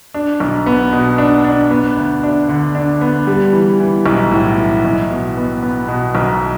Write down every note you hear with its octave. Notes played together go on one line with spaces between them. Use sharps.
D4
B1
B3
B2
D4
D4
B3
D2
D4
D3
D4
B3
G3
E3
E3
B1
A2
E3
B1
B2
B3
B3
B2
B1